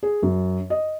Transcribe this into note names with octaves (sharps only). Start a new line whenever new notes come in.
G#4
F#2
D#5